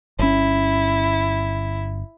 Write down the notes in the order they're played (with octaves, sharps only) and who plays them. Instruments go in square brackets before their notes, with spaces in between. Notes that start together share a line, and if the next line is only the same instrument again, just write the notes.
[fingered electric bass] G1 C#4 [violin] E4